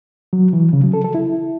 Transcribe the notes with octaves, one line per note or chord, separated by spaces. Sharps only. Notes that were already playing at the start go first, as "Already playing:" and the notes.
F#3
E3
C#3
F#3
A4
A4
E4